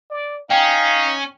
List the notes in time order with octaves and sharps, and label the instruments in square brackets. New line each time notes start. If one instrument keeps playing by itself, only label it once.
[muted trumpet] D5
[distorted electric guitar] C#4 [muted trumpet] D#4 [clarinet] F5 [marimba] G5